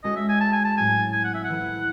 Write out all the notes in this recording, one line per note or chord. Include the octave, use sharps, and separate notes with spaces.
G#3 C#4 F#4 A4 D#5
E5
G#5
A5
G#5
A5
A2 F#3 A3 C4 G#5
G#5
F#5
E5
F#5
E3 C4 E4 A4